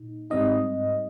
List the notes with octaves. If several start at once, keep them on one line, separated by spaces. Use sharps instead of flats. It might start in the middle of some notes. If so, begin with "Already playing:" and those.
Already playing: A#2 D#4
G#2 G3 C4 D#4 D#5